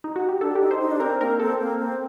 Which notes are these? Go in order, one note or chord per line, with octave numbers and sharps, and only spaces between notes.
D#4
F#4
G4
D4 A4
G4
D#4
C5
D#4
D4
C4 A#4
A#3 A#4
C4 A4
A#3
C4